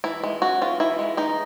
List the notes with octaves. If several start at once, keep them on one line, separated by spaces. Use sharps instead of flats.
E3 E4
G#3
C#4 F#4
E3 F4
E3 E4
G#3
E3 D#4